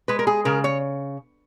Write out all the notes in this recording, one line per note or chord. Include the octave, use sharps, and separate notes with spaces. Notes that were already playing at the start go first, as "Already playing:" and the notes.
G#3 B4
A#4
G#4
C#3 A#4
C#5